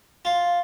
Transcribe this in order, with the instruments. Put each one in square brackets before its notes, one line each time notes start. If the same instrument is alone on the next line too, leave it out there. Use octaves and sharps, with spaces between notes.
[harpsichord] F4